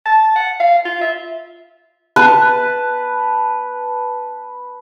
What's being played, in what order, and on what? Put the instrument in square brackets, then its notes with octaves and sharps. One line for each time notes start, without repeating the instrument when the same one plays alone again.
[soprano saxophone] A5
F#5
F5
F4
E5
[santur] B4 A5